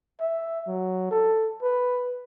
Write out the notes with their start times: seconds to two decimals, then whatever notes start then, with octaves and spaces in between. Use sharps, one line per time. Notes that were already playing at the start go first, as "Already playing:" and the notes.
0.20 E5
0.67 F#3
1.11 A4
1.62 B4